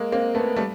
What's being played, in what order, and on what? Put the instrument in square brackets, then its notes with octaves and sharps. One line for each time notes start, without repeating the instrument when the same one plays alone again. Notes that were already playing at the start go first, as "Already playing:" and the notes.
Already playing: [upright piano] G#3 A#3
A#3 C4
A3 B3
G3 A3